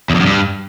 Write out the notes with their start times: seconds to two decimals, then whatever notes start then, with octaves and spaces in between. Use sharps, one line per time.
0.10 E2
0.15 F2
0.20 F#2
0.26 G2